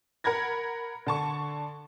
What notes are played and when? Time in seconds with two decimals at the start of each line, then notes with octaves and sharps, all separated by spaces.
0.24 A#4 F#5 B5 G#6 A#6
1.06 D3 A5 C#6